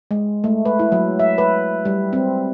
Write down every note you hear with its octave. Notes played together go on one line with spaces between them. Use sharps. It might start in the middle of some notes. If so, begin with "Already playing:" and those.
G#3
A3
B4
E4
F#3
E5
B4
G3
C4